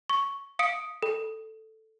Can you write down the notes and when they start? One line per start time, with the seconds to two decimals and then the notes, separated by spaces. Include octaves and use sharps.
0.10 C#6
0.59 F5 D#6 C#7 D7
1.02 A4